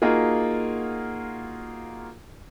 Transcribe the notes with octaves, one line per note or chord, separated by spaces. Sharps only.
A#3 D#4 F4 F#4 G#4